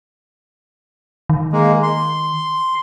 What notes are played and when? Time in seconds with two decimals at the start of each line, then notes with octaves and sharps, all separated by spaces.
1.29 D#3
1.52 G#3 A#3
1.83 C6